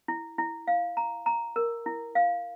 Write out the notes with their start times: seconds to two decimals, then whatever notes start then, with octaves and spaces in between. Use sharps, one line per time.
0.08 E4
0.38 E4
0.67 F5
0.97 A#5
1.26 A#5
1.56 A#4
1.86 E4
2.15 F5